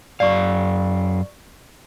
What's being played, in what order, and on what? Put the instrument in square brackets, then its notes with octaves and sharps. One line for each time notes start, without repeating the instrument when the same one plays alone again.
[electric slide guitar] F#2 F5 [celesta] D5 C#6